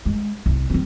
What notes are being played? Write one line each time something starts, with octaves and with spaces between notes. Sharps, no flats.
G#3
C2
F3 C4